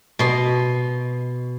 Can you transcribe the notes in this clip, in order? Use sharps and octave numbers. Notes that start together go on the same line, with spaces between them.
B2 C6